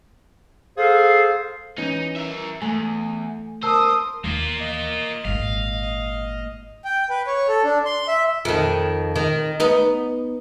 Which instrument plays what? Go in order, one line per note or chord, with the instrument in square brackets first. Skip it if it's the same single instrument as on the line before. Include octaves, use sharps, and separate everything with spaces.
[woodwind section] G#4 A4 C5 F5
[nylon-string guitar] E3 C#4 [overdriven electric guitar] D#4
[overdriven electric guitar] A#4 E5
[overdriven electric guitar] E2 [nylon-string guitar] A3 [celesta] G#5
[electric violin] A#4 D#6 [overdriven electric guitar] C5 [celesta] A5 E6
[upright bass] D#2 E3 [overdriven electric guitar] A#3 F4
[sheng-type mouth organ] D#5
[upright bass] G#1 A#2 [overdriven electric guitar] F5
[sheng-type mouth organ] G5
B4
C#5
A4
D4
C6
E5
[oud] F2 D#3
D#3
B3 D#4